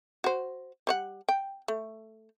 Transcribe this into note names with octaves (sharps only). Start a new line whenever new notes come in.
F#4 C5
G3 C#5 F#5
G5
A3